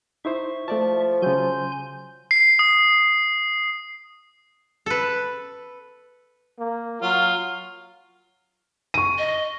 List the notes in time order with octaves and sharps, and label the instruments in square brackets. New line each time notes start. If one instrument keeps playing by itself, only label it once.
[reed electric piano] D#4 E4 C5 [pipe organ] E5 C#6
[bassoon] F3 [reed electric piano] A3 D5 A5
[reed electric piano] C#3 F#3 [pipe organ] G#5 C6 G6
[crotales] C7
D#6
[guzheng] A4 B4
[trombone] A#3
[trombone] F#3 [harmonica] F4
[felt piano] C#6 D#7
[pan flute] D#5